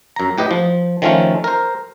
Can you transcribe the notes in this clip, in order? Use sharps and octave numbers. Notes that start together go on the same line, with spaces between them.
F#2 A#5
A2 G4 B4 D#5
F3
D#3 F3 A3 C#4 F4
A#4 C5